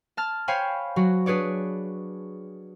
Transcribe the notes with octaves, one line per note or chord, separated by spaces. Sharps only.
A5 F6 A6
C5 C#5 F5 G5 G#5 B5
F#3 F#4
D4 G#4 B4 C#5 D5